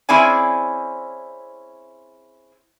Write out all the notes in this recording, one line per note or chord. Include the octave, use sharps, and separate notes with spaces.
C4 C#4 E4 G#4 D5 G#5